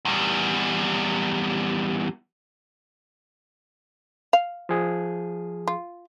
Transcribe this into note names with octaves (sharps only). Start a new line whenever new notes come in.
E2 G3
F5
F3 G#4
F4